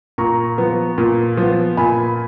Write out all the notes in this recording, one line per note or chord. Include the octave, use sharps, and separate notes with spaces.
A#2 A#5 C#6
F3 B3
A#2
F3 B3
A#2 G#5 B5